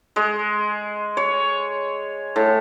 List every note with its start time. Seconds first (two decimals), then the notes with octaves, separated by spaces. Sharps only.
0.16 G#3
1.17 C#5
2.36 A2